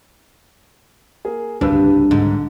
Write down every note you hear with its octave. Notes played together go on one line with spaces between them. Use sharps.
A#3 G#4
D1 C2 G2 C#3 D4 B4 E6
G#2 D3